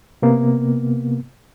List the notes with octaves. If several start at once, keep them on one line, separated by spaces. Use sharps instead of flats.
C3 A#3 B3